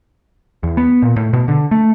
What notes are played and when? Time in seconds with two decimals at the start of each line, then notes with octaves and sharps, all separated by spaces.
0.63 E2
0.77 B3
1.02 A#2
1.16 A2
1.33 B2
1.48 D3
1.71 A3